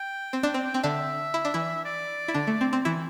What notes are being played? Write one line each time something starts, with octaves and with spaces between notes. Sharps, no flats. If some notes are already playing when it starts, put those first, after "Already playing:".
Already playing: G5
C4
D4
C4
C4 G5
D3 D4 E5
E4
D4
E3 E4
D5
E4
D3 D4
A3
C4
C4
E3 E4